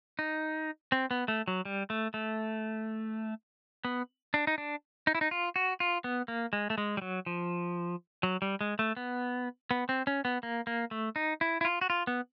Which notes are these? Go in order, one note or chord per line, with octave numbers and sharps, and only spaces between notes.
D#4
C4
B3
A3
F#3
G3
A3
A3
B3
D4
D#4
D4
D#4
E4
D#4
F4
F#4
F4
B3
A#3
G#3
A3
G#3
G3
F#3
F3
F#3
G3
G#3
A3
B3
B3
C4
C#4
B3
A#3
A#3
A3
D#4
E4
E4
F4
F#4
F4
B3